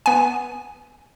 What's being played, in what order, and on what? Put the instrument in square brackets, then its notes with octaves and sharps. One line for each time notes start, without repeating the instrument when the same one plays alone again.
[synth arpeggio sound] B3 G#5